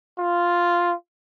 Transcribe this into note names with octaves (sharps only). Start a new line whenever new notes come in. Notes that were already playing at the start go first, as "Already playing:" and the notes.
F4